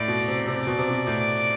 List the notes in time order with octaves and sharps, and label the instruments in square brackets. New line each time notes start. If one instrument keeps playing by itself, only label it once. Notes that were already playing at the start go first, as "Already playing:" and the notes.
Already playing: [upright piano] A2 [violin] D5
[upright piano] B2
C3
C3
[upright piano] B2 [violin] D5
[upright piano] C3
B2
A2